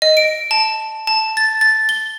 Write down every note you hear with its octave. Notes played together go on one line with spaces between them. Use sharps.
D#5
D7
A5
A5
A6
A6
G7